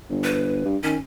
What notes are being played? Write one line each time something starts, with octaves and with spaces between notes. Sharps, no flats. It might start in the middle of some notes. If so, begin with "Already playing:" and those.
G1
B4
G2
D#3 C#4